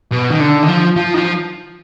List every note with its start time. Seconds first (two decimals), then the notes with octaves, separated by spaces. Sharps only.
0.12 B2
0.30 D#3
0.40 D3
0.63 D#3
0.68 F3
0.96 F3
1.14 D#3
1.18 F3